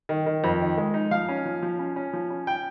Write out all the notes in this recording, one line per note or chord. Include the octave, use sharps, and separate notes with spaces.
D#3
D#3
F2
D#3
G#3
D#4
F3 F5
C#4
F3
F3
C#4
C#4
F3
C#4
G5